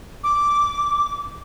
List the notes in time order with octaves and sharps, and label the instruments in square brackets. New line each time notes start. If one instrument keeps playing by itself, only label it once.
[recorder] D6